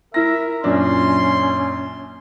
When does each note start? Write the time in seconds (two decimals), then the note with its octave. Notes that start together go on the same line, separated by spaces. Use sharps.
0.14 E4 A#4 E5 A#6
0.64 F#2 A#2 C#4 D4 C6